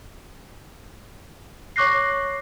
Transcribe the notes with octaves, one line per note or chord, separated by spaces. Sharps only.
C#5 C#6 D6 F#6 A#6 C7